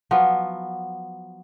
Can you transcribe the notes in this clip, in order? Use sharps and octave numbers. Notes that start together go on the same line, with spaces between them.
F3 F#3 B3